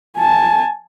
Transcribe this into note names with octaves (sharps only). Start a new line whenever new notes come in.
G#5 A5